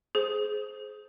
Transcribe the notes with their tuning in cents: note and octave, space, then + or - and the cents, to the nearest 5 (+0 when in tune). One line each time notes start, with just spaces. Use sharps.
G#4 +25 C5 +0